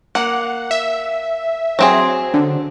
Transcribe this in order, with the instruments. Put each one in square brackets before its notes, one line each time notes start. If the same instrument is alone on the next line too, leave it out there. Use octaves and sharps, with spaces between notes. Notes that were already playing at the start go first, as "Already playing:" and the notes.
[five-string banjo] A#3 [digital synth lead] F#5
[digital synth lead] E5
[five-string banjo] F#3 C4 G#4
[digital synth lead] D3